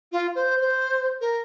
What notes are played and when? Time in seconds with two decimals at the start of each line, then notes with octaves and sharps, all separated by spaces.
0.12 F4
0.35 C5
0.61 C5
1.21 A#4